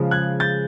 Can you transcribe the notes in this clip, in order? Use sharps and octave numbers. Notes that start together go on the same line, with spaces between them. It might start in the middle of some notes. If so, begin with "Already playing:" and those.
Already playing: C#3 F3 G#3
F#6 G#6
G6 A6